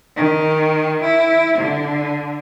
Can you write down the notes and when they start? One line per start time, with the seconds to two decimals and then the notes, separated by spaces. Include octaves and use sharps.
0.16 D#3
1.03 E4
1.58 D3